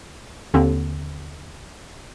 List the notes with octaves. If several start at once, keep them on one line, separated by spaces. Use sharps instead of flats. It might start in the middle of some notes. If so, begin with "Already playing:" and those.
D#2 D3 C4